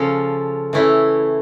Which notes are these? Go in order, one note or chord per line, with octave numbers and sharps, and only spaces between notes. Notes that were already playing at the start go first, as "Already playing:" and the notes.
Already playing: C#3 F3 C#4 F4 A4
E3 A3 C#4 E4